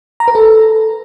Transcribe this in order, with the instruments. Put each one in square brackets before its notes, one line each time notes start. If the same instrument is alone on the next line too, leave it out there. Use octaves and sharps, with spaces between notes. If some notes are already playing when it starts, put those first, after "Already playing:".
[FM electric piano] A#5
B4
A4